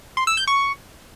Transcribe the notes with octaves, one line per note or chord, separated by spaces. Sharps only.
C6
E6
G6
C#6